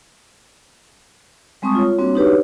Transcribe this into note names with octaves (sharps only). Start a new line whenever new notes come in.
G3 G#3 C4 A5 C#6 D#6
F4 C#5
G3 A#3 C4 D4 F#4 C#5
D4 D#4 F#4 G4 B4 C#5